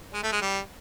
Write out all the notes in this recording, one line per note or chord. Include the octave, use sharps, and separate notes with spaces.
G#3
A3
G#3
G3